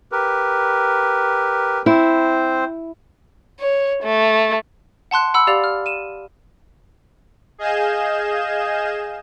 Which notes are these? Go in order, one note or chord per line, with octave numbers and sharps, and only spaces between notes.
G4 A#4 B4
C4 E4 C5
C#5
A3
F#5 A5 C6 F#6
F#5 B5 E6
G4 D5 F5 A6 F7
F6
D#7 E7
G#4 D#5 F5 G#5 G6 E7